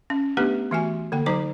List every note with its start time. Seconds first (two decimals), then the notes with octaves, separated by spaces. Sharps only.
0.10 C#4
0.37 A3 B3 D4 G4 B4
0.71 E3 A3 F#4 G#5
1.12 D3 A#3 G5
1.26 F#3 D#4 C5 A#5 D6